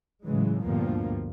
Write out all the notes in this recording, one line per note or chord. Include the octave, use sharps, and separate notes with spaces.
A2 C#3 E3 F#3 G#3
D2 G2 A#2 F3 A#3 B3